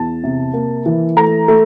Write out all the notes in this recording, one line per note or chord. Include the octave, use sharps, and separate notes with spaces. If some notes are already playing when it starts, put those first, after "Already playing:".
Already playing: E2 A5
C3
A#3
E3
A3 A#5
A3